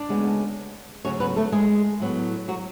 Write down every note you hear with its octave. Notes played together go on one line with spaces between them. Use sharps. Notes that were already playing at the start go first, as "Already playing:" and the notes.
Already playing: D4 D5
D2 C#3 G#3 B3
D2 C#3 F#3 C#4 C#5
B3 B4
A3 A4
G#3 G#4
A2 F#3 B3
F#3 F#4